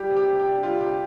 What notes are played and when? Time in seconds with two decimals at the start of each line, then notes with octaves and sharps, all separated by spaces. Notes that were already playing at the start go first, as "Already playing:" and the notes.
Already playing: G3 G4
0.10 C3
0.16 G4
0.28 C3
0.39 G4
0.46 D4
0.63 G3 F4
0.81 C3 G4